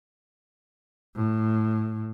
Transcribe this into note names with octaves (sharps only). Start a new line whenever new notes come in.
A2